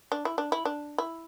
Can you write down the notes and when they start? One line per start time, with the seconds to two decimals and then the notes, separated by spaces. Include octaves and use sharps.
0.12 D4
0.25 E4
0.38 D4
0.52 E4
0.65 D4
0.98 E4